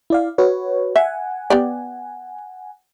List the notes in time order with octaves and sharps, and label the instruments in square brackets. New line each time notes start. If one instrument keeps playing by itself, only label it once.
[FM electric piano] E4 D5 F5
F#4 B4 C#5
[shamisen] E5 [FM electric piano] F#5 G#5
[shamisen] B3 G4 D5